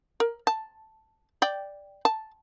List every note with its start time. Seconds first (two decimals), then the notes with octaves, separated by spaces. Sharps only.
0.20 A#4
0.47 A5
1.42 D5 G5
2.05 A5